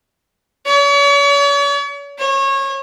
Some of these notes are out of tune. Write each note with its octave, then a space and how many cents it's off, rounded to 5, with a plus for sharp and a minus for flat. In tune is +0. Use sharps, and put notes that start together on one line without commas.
C#5 +40
C#5 -25